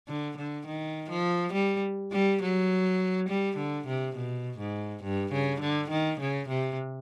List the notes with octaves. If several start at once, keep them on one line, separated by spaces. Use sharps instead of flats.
D3
D3
D#3
F3
G3
G3
F#3
G3
D3
C3
B2
G#2
G2
C#3
D3
D#3
C#3
C3